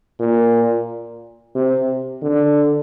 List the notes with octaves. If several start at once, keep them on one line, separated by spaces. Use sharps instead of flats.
A#2
C3
D3